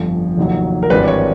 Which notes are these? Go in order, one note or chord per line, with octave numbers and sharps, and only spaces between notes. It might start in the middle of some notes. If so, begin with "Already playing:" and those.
Already playing: G1 F2 D3
F1 D#2 D#3 F#3
A#4
G#1 G2 E3 G3 C4 B4
D5
C#5